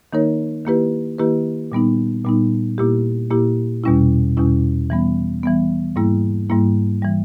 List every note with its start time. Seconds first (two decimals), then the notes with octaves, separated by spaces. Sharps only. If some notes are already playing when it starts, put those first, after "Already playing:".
0.13 D#3 A#3 D#4 A#4 C#5
0.65 D#3 A#3 E4 G4 B4
1.18 D#3 A#3 E4 G4 B4
1.72 A#2 G3 B3 D#4
2.25 A#2 G3 B3 D#4
2.78 A#2 A#3 E4 G4
3.30 A#2 A#3 E4 G4
3.83 E2 B2 G3 C#4 E4
4.37 E2 B2 G3 C#4 E4
4.90 E3 G3 B3
5.43 E3 G3 B3
5.96 G#2 G3 A#3 E4
6.50 G#2 G3 A#3 E4
7.02 E3 G3